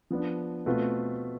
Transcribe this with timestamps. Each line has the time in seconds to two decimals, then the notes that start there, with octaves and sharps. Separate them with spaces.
0.10 F3 B3 D4
0.66 B2 A3 C4 F4 B4